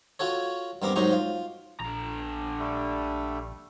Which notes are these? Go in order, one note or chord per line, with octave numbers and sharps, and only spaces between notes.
F4 F#4 A4 C#5
G2 B3 C4 A#4 D6
G#2 F#3 D#4 A#4 C5 C#6
F4
A#1 D3 A#5
G3 A3